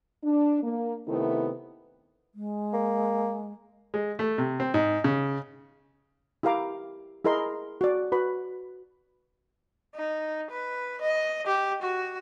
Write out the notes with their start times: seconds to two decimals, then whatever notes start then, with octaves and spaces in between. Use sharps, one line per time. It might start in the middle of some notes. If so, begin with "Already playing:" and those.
0.24 D4
0.63 A#3
1.07 C3 D#3 A3 B3 E4
2.35 G#3
2.73 A#3
3.94 G#3
4.19 A3
4.38 C3
4.60 C4
4.74 G#2
5.04 C#3
6.43 E4 G4 A#4 F5 A#5 D6
7.25 E4 G#4 A#4 D#5 C6
7.81 F#4 D5
8.12 F#4 B4 B5
9.95 D#4
10.51 B4
11.01 D#5
11.47 G4
11.82 F#4